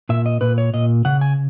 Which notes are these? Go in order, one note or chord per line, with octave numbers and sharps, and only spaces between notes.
A#2 E5
D#5
A#2 B4
C#5
A#2 D#5
C#3 F#5
G#5